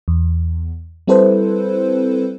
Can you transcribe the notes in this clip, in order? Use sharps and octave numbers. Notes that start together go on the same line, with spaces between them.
E2
G3 C4 E4 A4 B4 C5